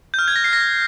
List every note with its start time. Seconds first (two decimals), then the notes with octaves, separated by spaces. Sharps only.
0.14 G6
0.19 F6
0.28 G#6
0.36 A#6
0.44 C7
0.53 A#6